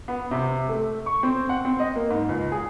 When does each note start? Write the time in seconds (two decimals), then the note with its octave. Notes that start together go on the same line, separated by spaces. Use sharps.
0.08 B3
0.31 C3
0.69 A3
1.06 C#6
1.23 C4
1.49 F#5
1.65 C4
1.79 D#5
1.96 A#3
2.10 G#2
2.29 C#2
2.52 G#4